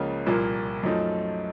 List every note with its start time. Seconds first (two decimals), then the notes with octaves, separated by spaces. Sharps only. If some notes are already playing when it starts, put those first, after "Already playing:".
Already playing: C#2 C#3 F3 A#3
0.26 C2 A#2 F3 A#3
0.83 F#2 F3 A3 D#4